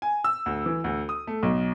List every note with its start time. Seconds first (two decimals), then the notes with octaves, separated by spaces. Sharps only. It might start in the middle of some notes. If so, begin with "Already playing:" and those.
0.02 G#5
0.24 E6
0.46 D2
0.66 E3
0.84 D2
1.09 D#6
1.27 A3
1.43 B1